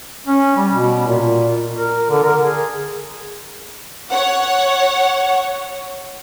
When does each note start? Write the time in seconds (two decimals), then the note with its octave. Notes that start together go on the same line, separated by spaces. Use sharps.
0.27 C#4
0.57 G3
0.71 B2
1.07 A#2
1.74 A#4
2.10 D3
2.23 A#4
2.41 G#4
4.12 C#5 F#5